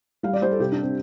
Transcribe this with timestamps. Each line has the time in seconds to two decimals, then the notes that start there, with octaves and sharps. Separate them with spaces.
0.23 G3 F5
0.33 D5
0.42 G3 C5
0.51 A4
0.59 C3 G4
0.72 D4
0.83 C4